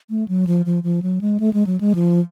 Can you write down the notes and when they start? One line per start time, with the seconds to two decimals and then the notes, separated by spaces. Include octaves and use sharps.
0.10 A3
0.28 F#3
0.47 F3
0.66 F3
0.83 F3
1.02 F#3
1.21 G#3
1.40 A3
1.53 G#3
1.67 F#3
1.80 G#3
1.95 F3